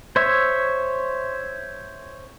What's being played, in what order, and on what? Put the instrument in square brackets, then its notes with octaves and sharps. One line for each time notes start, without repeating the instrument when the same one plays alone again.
[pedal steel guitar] C5 C#5 E5